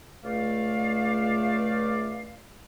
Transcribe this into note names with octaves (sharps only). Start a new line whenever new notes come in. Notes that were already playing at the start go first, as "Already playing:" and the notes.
C#2 A3 D5 F5